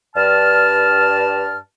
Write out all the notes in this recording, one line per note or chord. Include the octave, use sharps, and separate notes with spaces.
G2 A5 F6